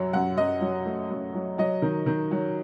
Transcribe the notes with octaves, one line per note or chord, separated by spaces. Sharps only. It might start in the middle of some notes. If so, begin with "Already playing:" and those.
Already playing: F#2 F#3
F#2 F#5
F#2 D#5
F#3
A3
F#2
F#3
F#3 D#5
D#3
D#3
F#3